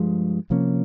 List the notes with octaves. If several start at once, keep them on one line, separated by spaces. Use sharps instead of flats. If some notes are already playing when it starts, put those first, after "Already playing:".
Already playing: G2 F3 G#3
C3 F3 A#3 C#4